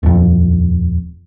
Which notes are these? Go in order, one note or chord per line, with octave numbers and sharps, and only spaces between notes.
D#1 F2